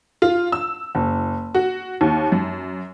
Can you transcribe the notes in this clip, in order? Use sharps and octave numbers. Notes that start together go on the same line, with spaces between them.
F4
E6
F#1
F#4
D#2
F#2